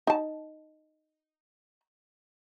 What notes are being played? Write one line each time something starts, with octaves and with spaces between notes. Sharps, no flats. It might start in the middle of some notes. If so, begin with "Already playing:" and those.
D#4 A5